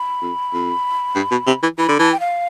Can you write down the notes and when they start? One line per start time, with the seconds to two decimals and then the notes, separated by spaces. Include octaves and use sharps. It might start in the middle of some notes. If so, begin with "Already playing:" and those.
Already playing: B5
0.21 F2
0.53 F2
1.15 G2
1.31 B2
1.47 C3
1.63 E3
1.78 E3 B5
1.89 D3
1.99 E3 A5
2.12 G5
2.20 F5